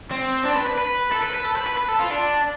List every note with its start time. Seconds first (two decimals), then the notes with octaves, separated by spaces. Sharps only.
0.11 C4
0.45 D4
0.56 B4
0.67 B4
0.78 B4
1.11 A4
1.22 B4
1.34 B4
1.45 A4
1.55 B4
1.67 B4
1.77 B4
1.88 A4
1.99 F4
2.11 D4